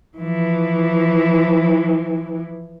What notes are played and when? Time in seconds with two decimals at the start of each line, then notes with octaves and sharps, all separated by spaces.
0.18 E3 F3